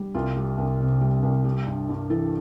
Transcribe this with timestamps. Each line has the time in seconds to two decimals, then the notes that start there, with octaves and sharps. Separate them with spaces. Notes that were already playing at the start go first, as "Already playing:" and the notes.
Already playing: G3
0.14 C2 F4
0.36 G3
0.58 C2
0.80 C3
1.01 G3
1.23 C2
1.44 G3
1.67 G2
1.89 G2
2.10 E3 A4